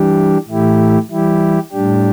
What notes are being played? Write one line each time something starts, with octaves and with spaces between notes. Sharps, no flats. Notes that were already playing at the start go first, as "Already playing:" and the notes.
Already playing: E3 G3 D4 G4
A2 E3 A3 E4 G4
E3 G3 E4 G4
A2 G3 D4 G4